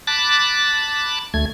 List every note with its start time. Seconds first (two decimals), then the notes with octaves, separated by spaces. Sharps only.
0.07 A5 B5 D6 F#6 A6
1.34 D2 A3 G#6